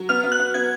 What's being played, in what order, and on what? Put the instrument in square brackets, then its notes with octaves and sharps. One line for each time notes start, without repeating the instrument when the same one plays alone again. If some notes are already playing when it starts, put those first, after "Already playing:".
Already playing: [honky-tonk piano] F#3
[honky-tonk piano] B3 [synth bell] F6
[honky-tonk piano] B3
[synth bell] F#6
[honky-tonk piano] B3
[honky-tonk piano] B3 [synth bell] G#6